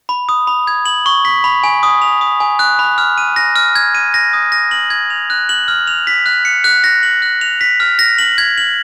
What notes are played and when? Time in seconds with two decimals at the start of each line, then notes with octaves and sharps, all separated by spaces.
0.09 B5
0.29 D#6
0.47 B5
0.67 G#6
0.86 F#7
1.06 C#6
1.25 B6
1.44 B5
1.64 G#5
1.83 D#6
2.02 F7
2.21 D#6
2.40 G#5
2.59 F#6
2.79 B5
2.98 F6
3.18 D#7
3.36 A#6
3.56 F6
3.76 G#6
3.95 D#7
4.14 A#6
4.33 D#6
4.52 A#6
4.71 F#7
4.90 G#6
5.10 F7
5.30 F#6
5.49 F#7
5.68 F6
5.87 F7
6.07 B6
6.26 F#6
6.45 C#7
6.64 F#6
6.84 A#6
7.03 F#7
7.22 F#6
7.41 F7
7.61 B6
7.80 F6
7.99 A#6
8.18 F#7
8.38 G#6
8.58 F#7